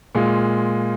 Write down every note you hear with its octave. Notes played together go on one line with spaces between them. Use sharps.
A#2 G#3 F4